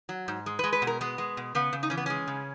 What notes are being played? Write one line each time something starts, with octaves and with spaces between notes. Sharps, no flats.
F#3
G#2
G#3
B4
G#3
B4
B2
A#4
G#3 B3
G#3
B2
C#3 B3
C#3
D#4
E3 C#4
B3
G#3 C#4
C#3